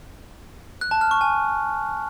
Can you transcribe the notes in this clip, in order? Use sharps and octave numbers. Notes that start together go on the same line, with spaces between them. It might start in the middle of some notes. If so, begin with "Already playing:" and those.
F#6
A5
F6
C#6
G#5